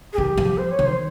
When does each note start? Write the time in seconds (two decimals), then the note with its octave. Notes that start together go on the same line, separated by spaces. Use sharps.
0.13 G#4
0.18 D#3 G4
0.37 F3
0.58 C5
0.71 C#5
0.79 D#3
0.85 C5